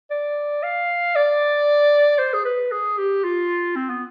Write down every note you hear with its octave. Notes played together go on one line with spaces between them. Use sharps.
D5
F5
D5
C5
G#4
B4
G#4
G4
F4
C4
B3